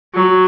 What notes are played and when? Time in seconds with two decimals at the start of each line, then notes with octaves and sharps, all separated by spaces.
0.14 F#3